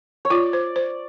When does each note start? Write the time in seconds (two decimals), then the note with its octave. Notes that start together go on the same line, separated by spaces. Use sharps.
0.25 C#5
0.30 F4 D5
0.53 C5
0.76 C5